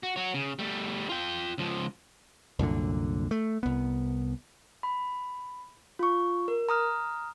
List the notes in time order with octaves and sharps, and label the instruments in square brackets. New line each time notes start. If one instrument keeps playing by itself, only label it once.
[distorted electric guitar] F#4
F#4 C#5
C#3
G3 A3
F4 G5
C#2 F3
[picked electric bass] C2 F#2 A#2 D3
A3
C2 B3
[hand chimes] B5
F4 C#6
A#4
A#5 D#6 F6